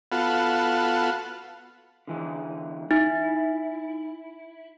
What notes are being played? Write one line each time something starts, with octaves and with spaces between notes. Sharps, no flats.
B3 F4 F#4 A4
D3 E3 G#3
D#4 E4